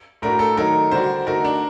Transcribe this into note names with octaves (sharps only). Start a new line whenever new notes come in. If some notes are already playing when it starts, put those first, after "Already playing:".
A2 A3 D4 F#4 A#4
A4
D#3 F#3 A3 D#4 A#4
D3 G3 D4 F#4 C5
D3 A3 D#4 F#4 A#4
D4